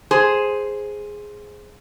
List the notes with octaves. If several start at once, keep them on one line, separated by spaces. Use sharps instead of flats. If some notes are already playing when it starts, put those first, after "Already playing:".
G#4 C5